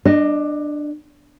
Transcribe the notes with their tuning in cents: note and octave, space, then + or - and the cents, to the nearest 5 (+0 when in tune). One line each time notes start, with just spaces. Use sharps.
D4 +15 D#5 -10